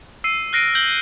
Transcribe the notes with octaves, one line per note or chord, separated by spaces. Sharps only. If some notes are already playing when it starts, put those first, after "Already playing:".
E6 C7 D#7
F6 F#6 A#6 C7 D7 D#7
G6 F#7 G7